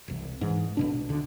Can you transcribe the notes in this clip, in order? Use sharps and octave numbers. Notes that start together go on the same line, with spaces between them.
E1 C2
G#2 E3
B1 B2 D4
D2 D3